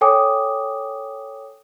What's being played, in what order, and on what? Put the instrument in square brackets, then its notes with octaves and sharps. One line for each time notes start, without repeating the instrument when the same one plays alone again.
[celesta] A4 C#5 G5 G#5 D6 D#6